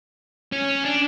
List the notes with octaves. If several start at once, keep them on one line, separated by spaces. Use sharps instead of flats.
C#4
D4